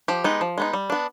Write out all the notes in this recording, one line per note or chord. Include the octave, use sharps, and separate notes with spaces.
F3 G4
G#3 B3 D#4
F3
G#3 B3 D#4
G3
B3 D4